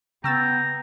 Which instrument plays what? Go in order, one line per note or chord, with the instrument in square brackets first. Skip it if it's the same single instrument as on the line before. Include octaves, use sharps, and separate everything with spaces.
[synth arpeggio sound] C#3 E6 A6 [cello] B3 [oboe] G5 [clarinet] A#5